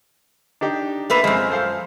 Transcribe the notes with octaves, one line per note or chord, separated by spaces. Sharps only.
D4 D#4 G4
A3 A#3 B4
F#2 F3 G#3 C4
A4 C5 F5